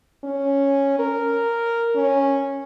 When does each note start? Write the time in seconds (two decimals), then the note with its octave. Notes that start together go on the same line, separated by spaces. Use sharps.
0.24 C#4
0.99 A#4
1.96 C#4